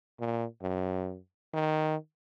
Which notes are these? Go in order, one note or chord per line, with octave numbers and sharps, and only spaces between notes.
A#2
F#2
D#3